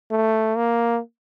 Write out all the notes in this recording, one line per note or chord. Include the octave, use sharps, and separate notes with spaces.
A3
A#3